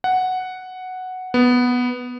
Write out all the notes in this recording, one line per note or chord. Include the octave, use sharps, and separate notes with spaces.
F#5
B3